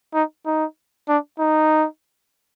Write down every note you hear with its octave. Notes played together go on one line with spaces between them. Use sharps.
D#4
D#4
D4
D#4